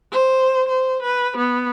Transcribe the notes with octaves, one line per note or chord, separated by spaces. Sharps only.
C5
C5
B4
B3